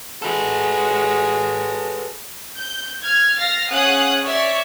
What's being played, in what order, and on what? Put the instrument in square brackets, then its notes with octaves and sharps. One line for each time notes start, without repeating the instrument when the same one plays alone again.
[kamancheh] G#3 F#4 [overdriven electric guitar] A4 B4
[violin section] G6
F6 G#6
F5 F6 A6 A#6 C7
C#4 G#4 F5 F#5 D#6 F#6
C#5 D5 E5